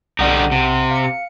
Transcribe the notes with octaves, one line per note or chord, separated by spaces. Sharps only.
B1 D3 G3 D#4 F#5 D#7
C3
F5 C#7